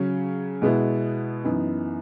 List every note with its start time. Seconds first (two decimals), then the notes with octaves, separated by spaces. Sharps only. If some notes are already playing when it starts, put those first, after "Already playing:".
Already playing: C#3 F#3 C#4
0.62 B2 G#3 B3 E4
1.44 F#2 E3 B3 D#4